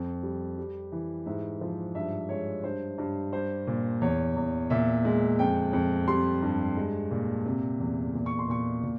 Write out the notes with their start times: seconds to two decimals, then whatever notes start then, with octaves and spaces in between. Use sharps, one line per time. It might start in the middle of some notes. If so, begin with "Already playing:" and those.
Already playing: F2
0.23 G3
0.58 G3
0.92 E3
1.26 G#2 E5
1.61 F3
1.95 G2 E5
2.29 G#3 C#5
2.64 G2 C5
2.98 G2
3.33 G3 C5
3.67 A#2
4.01 E2 C#5
4.36 E2
4.70 A#2 E5
5.05 G#3
5.39 F2 G5
5.73 F2
6.08 G3 C6
6.42 G2
6.77 G#3
7.11 A#2
7.45 C3
7.80 E2
8.14 A#2
8.26 C#6
8.39 C6
8.49 A#2 C#6
8.83 A#2